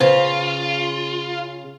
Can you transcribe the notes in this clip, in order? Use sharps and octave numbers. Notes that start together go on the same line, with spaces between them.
C#3 F4 B4 C5